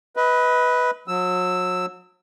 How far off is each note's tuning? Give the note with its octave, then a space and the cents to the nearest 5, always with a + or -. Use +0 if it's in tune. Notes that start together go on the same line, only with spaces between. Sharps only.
B4 +0 D#5 +35
F#3 -35 E6 +0